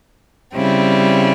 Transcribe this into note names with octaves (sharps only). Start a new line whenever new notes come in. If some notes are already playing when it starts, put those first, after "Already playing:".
C#3 G3 C4 E4